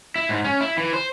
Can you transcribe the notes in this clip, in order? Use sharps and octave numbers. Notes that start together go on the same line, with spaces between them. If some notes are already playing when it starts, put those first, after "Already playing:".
E4
G#2
C#4
E4
E3
C5